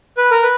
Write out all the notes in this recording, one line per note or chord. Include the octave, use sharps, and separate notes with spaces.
B4
A#4
B4